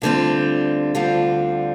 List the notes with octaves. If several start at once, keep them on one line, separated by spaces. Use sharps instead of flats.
D2 D3 G3 C4 F4
D2 D3 G3 C4 F4